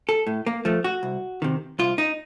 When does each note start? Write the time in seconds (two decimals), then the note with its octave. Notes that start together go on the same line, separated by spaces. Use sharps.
0.09 A4
0.27 A2
0.46 A#3
0.65 F3 A3
0.84 F#4
1.03 C2
1.42 C3 D#3
1.79 C2 F4
1.98 D#4